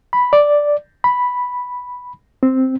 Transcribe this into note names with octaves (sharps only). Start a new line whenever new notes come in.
B5
D5
B5
C4